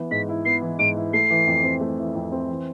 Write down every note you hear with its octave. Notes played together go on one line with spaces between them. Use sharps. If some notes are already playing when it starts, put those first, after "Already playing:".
Already playing: E3 B3
G#2 B6
E4
B3 C7
E3
G#2 D7
E4
A3 C7
E3
F2
C4
A3
E3
F2
C4
E3